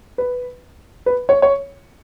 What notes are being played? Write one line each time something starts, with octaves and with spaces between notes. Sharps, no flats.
B4
B4
C#5
C#5